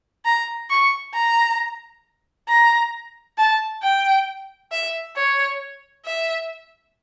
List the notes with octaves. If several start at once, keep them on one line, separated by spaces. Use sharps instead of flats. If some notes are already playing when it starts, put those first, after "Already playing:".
A#5
C#6
A#5
A#5
A5
G5
E5
C#5
E5